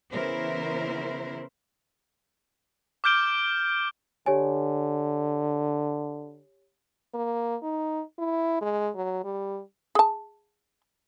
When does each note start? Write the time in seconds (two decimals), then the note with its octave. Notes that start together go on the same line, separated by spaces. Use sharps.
0.12 C#3 E3 B3 E4 A#4 C5
3.04 D6 F6 G6 D7 G7
4.26 D3 G4 C#5 G#5
7.14 A#3
7.63 D#4
8.19 E4
8.61 G#3
8.95 F#3
9.24 G3
9.95 G#4 A5